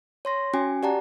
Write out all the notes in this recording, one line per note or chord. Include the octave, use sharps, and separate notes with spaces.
C#5 C6 A#6
C#4 F#4 G5 G#5
G4 D5 F#5 A5 A#5